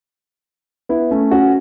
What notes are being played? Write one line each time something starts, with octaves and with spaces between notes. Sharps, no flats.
B3 E4
A3 C#4
C#4 F#4